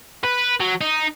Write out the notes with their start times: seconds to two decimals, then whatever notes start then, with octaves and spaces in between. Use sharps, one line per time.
0.24 B4
0.60 F#3
0.81 D#4